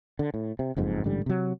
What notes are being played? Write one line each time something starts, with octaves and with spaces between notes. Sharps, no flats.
D3
A2
C3
F#1 F2 G#2
A1 G#2 D3 G3
C3 F#3